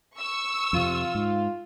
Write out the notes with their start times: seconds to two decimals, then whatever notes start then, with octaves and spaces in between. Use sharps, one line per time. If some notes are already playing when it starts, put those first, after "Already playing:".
0.16 C#6 E6
0.73 F2 C3 F4
1.15 G#2